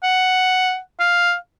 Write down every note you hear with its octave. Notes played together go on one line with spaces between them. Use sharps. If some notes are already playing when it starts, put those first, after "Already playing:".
F#5
F5